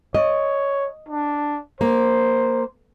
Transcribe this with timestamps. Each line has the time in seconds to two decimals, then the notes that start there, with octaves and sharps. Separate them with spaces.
0.15 C#5 D#5
1.09 D4
1.81 A#3 C5